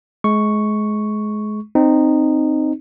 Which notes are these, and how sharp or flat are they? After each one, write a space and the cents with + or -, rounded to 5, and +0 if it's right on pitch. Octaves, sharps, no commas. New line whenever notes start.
G#3 +30 C#6 +0
C4 +0 D#4 -15